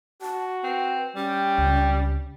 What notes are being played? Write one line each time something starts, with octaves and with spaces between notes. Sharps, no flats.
F#4 A5
C4 B4
G3 C#4 G5
C#2